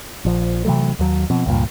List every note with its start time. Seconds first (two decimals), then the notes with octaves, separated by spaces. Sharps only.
0.25 A#1 F3
0.65 C3 E3 F#3 A3
0.99 D#2 F#3
1.30 B2 F3 C4
1.46 C#2 G2 A#2